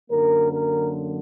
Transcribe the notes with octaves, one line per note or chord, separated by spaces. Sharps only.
F#2 D3 F#3 A#3 A#4
A#4